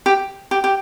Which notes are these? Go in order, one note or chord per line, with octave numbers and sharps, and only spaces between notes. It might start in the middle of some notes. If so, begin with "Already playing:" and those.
G4
G4
G4